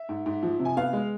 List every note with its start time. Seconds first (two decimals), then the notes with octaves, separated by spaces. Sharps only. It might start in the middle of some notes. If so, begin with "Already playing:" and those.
Already playing: E5
0.09 G#2
0.26 G#2
0.43 F3
0.59 C3
0.65 G#5
0.77 B3 F5
0.93 G#3